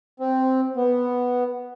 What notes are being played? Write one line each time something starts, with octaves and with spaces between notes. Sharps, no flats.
C4
B3